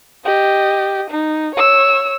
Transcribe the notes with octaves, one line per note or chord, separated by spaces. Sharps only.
G4 D#5
D#4
C#5 E6